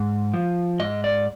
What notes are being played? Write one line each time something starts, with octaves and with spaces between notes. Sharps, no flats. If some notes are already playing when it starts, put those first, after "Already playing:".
Already playing: G#2
F3
G#2 D#5
D5